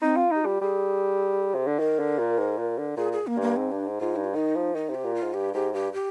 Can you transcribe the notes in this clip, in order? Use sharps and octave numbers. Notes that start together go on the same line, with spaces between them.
C4 D#4
F4
D#4 G4
G3 F4
G3 G#4
C3
D3
D#3 A#4
D3
A#2
G#2
A#2
D3
A#2 G#4
G#4
A#3
G2
A#3
G#2 C4
G2 D4
G#2
G#2 F4
G2 D#4
F4
D#3 D#4
F3
D#3 D#4
C3 G4
A#2
F4
G#2
G2 G4
G#2 G4
G2 G4
G4